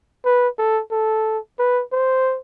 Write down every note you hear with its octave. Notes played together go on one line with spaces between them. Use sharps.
B4
A4
A4
B4
C5